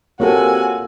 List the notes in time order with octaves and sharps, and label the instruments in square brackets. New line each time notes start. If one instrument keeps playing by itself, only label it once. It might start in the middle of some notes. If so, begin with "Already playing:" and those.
[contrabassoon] C3 [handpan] A#3 F4 A4 [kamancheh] F#4 G#5 [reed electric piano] A#4 C#5